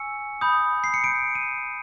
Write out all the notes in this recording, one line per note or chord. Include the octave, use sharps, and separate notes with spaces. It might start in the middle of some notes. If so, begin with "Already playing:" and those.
Already playing: G#5 C#6 E6 C#7
B5 D#6 G6
C7
C#7
B5 D#6 G6 D7
D#7